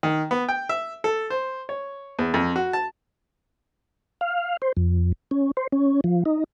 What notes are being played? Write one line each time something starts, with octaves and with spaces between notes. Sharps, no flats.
D#3
B3
G5
E5
A4
C5
C#5
E2
F2
F#4
A5
F5
C5
F2
C#4
C5
C#4
F3
D#4